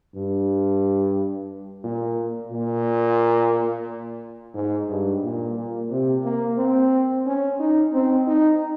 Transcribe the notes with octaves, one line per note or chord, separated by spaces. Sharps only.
G2
A#2
A#2
G#2
G2
A#2
A#2
C3
A#3
C4
C#4
D#4
C4
D#4